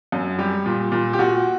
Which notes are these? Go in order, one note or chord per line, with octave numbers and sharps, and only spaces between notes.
F#2
G3 G4
A#2
A#2
G4
A#2 F#4